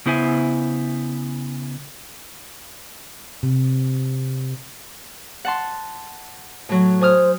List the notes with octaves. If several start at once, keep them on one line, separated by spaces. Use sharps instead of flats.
C#3 B3 E4 C5 E5 G#5
C3
F#5 A5 C6
A2 F#3
C5 G#5 D#6 F6